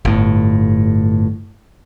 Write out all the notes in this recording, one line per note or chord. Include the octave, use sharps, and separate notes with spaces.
G1 A2